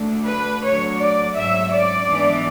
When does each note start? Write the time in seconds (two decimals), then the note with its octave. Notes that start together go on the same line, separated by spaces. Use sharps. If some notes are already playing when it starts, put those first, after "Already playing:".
Already playing: D2 D3 A3 D4
0.26 B4
0.62 D2 D3 F#3 C#5
0.99 D5
1.35 G#2 F#3 C#4 E5
1.71 D5
2.07 G#2 E3 B3 D4